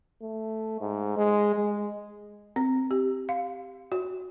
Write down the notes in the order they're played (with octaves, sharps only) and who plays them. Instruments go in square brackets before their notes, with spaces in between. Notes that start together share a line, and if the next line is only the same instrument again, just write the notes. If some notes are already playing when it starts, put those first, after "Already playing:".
[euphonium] A3
G#2
G#3
G#3
[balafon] C4
G4
F5
F#4